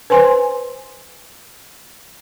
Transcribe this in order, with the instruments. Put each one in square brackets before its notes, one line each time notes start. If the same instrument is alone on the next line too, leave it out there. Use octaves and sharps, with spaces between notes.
[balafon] B4 C5 G#5 C6